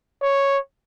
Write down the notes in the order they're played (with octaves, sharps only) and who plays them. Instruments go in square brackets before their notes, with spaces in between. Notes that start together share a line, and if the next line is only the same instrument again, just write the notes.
[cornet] C#5